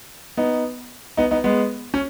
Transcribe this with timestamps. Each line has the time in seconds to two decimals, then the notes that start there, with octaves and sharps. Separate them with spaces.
0.37 B3 D#4
1.17 B3 D#4
1.31 B3 D#4
1.44 G#3 B3
1.94 C#4